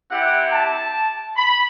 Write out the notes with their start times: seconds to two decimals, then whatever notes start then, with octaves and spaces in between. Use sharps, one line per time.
0.10 C4 E4 G4 F#5
0.52 A5
1.36 B5